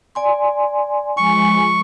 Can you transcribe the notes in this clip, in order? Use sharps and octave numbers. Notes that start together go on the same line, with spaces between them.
D5 G#5 C6
F3 G#3 G#5 B5 C#6